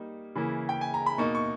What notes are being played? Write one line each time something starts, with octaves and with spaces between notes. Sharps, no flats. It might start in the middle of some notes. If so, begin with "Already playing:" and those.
Already playing: G3 A#3 D#4
C#3 E3 A#3 E4
G5
G#5
A#5
B5
B2 A#3 D#4 C#6
C#6